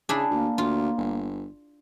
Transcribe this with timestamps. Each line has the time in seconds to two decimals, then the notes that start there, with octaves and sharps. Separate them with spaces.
0.09 C#3 D4 E4 G#4
0.30 D2 A#3
0.58 D2 F4
0.97 G1